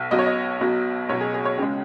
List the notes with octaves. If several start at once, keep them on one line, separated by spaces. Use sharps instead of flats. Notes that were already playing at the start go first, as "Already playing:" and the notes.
Already playing: B1 B2
B1 B2 F#3 D#5
C#5
D#5
B1 B2 F#3
B1 B2 F#3 C#5
G#4
G#4
C#5
C#2 C#3 G#3 G#4